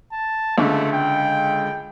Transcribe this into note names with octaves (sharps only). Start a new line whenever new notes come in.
A5
C#2 D3 A3
G5